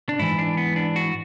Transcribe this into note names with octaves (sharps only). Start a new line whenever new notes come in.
D4
G#2 E3 E4
D4
B3
D4
F#4